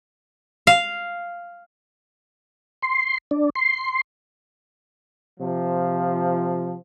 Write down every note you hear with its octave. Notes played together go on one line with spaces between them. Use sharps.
F5
C6
D4
C6
C3 F3